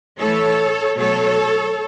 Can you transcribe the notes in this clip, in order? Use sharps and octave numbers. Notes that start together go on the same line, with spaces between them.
A2 E3 A3 A4 C#5
B2 F#3 A3 A4 C#5